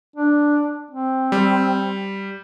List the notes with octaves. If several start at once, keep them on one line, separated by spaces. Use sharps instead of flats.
D4
C4
G3